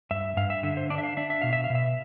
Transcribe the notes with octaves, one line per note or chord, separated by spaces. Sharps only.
G2 E5
G2 F5
E5
D3 E5
C5
D4 D5
E5
F5
D4 E5
E5
B2 F5
E5
F5
B2
E5